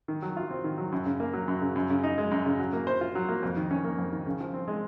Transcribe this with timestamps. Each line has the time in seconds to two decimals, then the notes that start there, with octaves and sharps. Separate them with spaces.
0.08 D#3
0.22 F#3
0.37 F4
0.51 C4
0.64 D#3
0.78 F#3
0.92 F#2
1.06 C#3
1.20 A#3
1.33 F#3
1.48 F#2
1.62 C#3
1.76 F#2
1.90 C#3
2.03 D#4
2.18 G#3
2.31 F#2
2.46 C#3
2.59 F#3
2.73 A#3
2.87 C5
3.01 F4
3.15 F#3
3.29 A#3
3.43 F2
3.57 D#3
3.71 C#4
3.85 A#3
3.99 F2
4.12 D#3
4.26 C#3
4.40 F3
4.54 C4
4.68 G#3